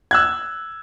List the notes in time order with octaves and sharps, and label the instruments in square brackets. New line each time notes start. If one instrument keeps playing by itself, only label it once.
[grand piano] E6 F#6 G#6